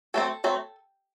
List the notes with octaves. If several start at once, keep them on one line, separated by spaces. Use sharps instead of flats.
F#3 A3 C4 A4
F#3 A3 C4